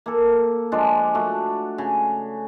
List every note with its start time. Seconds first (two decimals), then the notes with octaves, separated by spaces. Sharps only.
0.06 A#3 A4
0.72 F3 G#3 D4
1.15 A3 F#4
1.78 C#3